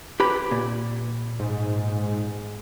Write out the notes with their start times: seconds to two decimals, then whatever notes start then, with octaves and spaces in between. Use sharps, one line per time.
0.20 G4 B4 B5
0.51 A#2
1.39 G#2